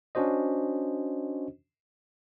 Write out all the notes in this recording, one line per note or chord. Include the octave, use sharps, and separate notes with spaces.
C#4 D4 F#4 C5 D#5